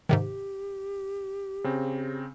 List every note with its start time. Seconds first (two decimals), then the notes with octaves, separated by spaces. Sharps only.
0.09 G#2 C3 D#3 G4
1.64 C#3 C4